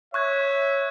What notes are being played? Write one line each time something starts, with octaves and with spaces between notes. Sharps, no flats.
C#5 E5 C#6 F#6 G#6